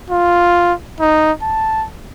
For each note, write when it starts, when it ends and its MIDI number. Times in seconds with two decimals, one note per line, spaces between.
0.10 0.73 65
1.00 1.32 63
1.42 1.85 81